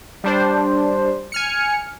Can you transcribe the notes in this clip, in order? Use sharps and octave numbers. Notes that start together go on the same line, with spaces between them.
G3 D4 C5
G#5 F6 C#7